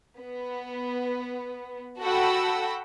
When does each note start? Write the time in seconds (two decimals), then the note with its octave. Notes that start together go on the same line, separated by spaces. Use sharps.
0.20 B3
2.00 F#4 A4 F#5 G5 B5 E6